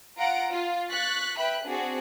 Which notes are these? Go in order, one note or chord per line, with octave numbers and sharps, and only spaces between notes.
F4 F#5 A#5 D7
F4
C#6 F#6 A6 B6
B4 E5 G5 B5 F#6
C4 D4 F#4 G#4